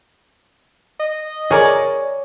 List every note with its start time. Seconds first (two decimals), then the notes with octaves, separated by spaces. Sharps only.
1.00 D#5
1.51 G#4 A#4 C#5 D5